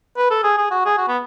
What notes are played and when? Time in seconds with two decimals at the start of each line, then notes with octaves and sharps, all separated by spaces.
0.18 B4
0.31 A4
0.44 G#4
0.58 G#4
0.71 F#4
0.86 G#4
0.98 F#4
1.08 B3